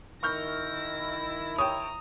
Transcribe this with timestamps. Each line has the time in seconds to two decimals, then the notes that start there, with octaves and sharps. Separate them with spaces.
0.23 D#3 E4 C#6 F6 G6 A#6
1.58 C#5 G5 A#5 D#6